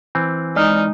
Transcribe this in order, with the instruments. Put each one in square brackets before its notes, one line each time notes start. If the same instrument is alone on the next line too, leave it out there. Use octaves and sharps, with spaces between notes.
[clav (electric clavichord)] E3 C4
[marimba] G#3 [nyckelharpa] D#4 [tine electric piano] D5 F6